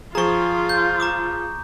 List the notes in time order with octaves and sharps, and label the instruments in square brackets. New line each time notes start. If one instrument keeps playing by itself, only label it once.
[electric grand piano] F3 G#4 [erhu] F4 [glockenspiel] A#5 C#6
[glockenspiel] G6
A#5 D6 D#6